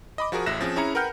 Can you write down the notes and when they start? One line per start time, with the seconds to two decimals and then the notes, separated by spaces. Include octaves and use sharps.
0.18 D#5 B5 D6
0.32 F3 F#4 G#4 A#4
0.46 A1 A2 E5 F#6 A#6 E7
0.61 F3 C4 C#4 G#4
0.76 C#4 E4 G#4 A#5 C#7
0.95 A#4 B4 F#5 G5 F6 G6